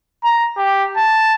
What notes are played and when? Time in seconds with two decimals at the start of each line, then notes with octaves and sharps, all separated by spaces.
0.24 A#5
0.57 G4
0.97 A5